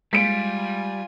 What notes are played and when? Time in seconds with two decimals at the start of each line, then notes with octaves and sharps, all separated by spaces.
0.13 G3 G#3 F4 G#5 B6 C#7 D7